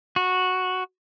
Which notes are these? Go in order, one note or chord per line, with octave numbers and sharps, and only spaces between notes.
F#4